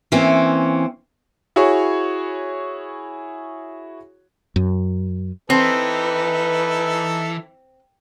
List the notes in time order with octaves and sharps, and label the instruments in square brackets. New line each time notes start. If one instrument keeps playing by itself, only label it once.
[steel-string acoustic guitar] E3 A#3 C4 C#4
[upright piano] E4 F#4 G#4 C#5 C#6
[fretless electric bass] F#2
[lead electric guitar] E3 [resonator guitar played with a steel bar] C4 [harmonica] D#4 A4 [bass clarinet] B4